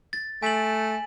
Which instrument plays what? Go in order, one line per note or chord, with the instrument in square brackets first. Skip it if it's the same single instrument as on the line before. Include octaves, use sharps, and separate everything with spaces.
[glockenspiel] A6
[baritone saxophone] A3 [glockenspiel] G#5 F#7